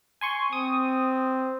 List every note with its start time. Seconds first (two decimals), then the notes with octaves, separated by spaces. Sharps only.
0.21 G#5 C6 C#6
0.53 C4 D#6